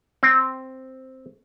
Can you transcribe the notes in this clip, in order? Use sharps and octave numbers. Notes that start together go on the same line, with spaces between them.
C4